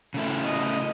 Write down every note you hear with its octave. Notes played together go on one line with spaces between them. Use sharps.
C#3 A3 E4
D#5